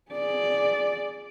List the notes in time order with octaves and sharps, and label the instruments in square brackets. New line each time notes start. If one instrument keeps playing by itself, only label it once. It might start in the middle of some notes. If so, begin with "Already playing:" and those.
[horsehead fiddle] G#4 D5